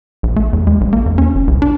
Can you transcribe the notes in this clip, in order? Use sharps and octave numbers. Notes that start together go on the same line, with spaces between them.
A#1
A3
E2
G#3
A#1
A#3
E2
C#4
G1
C2
D4